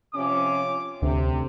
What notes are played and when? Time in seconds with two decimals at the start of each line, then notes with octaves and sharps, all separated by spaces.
0.14 C3 F3 C#4 D6
1.02 D2 C3